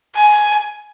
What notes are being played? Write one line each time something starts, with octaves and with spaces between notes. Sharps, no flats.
G#5